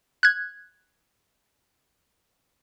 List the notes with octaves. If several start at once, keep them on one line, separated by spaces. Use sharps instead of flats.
F#6 G#6